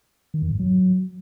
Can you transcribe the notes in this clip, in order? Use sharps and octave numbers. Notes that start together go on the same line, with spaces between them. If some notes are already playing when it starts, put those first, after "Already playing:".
D#3
F2
G#2
F#3